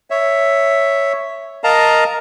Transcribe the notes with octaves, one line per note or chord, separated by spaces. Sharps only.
C#5 E5
A#4 D#5 F5 A5 A#5